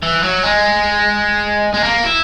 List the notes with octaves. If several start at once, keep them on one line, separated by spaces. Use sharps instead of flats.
E3
F#3
G#3
G#3
A#3
E4